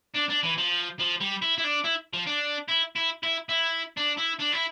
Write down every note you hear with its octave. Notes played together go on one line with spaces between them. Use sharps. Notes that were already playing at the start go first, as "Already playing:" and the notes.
D4
D4
E3
F3
F3
G3
E4
E4
D4
E4
F3
D4
E4
E4
E4
E4
D4
E4
D4
E4